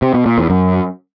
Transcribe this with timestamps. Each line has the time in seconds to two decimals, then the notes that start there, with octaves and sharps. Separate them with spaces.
0.02 C3
0.14 B2
0.26 A#2
0.38 E2
0.50 F#2